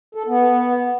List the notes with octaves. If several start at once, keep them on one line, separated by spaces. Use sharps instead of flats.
A4
B3